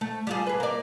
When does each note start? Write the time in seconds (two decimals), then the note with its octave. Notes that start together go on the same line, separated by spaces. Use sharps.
0.01 A3
0.27 G3 F4 G#4
0.47 G#4 B4
0.60 A#3 D5